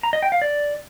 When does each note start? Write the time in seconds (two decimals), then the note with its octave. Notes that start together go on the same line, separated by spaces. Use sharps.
0.03 A#5
0.13 D#5
0.22 G5
0.32 F5
0.42 D5